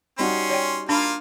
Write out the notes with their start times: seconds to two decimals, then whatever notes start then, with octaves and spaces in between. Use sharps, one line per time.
0.19 G3 C#4 D#4 F#4 C6
0.50 C#5 D5 G5
0.89 A#3 D4 F4 F5 B5